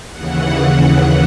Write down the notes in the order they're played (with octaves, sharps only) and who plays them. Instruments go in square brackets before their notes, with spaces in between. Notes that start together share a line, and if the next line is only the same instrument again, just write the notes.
[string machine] D#2 C#3 E3 F#5